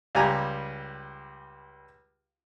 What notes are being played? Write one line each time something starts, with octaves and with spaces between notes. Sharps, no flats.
C#2 G3 G4 G#5 A#5